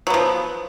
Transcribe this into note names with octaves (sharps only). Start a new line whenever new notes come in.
F3 F#3 B3